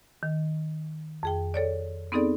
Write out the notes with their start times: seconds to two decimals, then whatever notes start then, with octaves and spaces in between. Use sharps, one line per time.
0.23 D#3
1.23 F2 G#4 G5
1.54 A4 C#5 D5
2.12 B3 C4 D#4 G#4 A4 D5